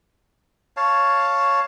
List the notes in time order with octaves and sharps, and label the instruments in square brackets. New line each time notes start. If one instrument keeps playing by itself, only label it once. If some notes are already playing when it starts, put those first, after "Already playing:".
[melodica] C#5 F5 A5